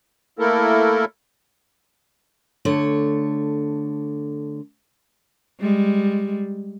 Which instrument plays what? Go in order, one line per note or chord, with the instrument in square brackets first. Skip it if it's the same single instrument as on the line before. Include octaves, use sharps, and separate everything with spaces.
[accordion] A3 A#3 E4 A4 A#4
[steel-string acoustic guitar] D3 A3 C#5
[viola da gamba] G3 G#3